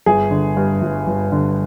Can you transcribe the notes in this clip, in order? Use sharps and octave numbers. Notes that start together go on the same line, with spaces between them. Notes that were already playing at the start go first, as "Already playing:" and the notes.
G1 G#4
D3
G2
G1
G1
D3